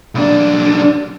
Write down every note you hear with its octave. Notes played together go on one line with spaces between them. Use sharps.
B1 D4